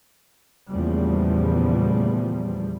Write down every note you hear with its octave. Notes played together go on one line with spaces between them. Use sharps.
E2 A#2 C#3 F3 G3 A3